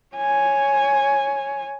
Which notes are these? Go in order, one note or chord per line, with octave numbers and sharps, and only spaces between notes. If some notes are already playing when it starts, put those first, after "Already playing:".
C#5 G#5